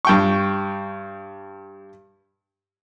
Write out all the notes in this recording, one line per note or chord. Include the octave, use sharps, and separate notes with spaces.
G2 G5 C#6